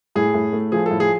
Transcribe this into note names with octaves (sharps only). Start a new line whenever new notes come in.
A2 G#4
A2
A3
F3 G#4
A2 A4
G#4